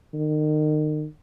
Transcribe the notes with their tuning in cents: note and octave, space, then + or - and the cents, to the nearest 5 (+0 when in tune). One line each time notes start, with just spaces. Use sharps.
D#3 -35